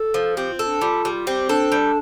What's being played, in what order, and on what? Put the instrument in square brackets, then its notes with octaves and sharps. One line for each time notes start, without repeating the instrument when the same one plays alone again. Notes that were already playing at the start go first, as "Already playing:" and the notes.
Already playing: [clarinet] A4
[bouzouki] F3
[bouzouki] C4 [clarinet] G4
[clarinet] F4
[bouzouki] A4
[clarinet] D4
[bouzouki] G3 [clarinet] F4
[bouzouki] G3
[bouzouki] C4 [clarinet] G4
[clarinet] D4 [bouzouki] A4
[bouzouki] G3